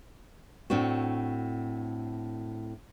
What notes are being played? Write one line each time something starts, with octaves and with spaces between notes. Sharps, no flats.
A2 C4 D4 F#4